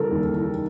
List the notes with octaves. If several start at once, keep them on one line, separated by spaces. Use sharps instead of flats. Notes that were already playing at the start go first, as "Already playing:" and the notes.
Already playing: C#3 E3 G3 A4 A#4
D#2
E3